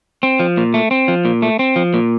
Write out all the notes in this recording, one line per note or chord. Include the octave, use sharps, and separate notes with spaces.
C4
F3
A#2
A3
C4
F3
A#2
A3
C4
F3
A#2